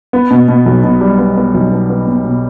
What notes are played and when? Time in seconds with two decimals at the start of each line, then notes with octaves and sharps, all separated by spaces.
0.13 B3
0.31 B2
0.48 B2
0.66 B1
0.83 B2
1.01 G3
1.18 B3
1.37 B3
1.54 B1
1.72 B3
1.89 B3
2.07 B2
2.24 B2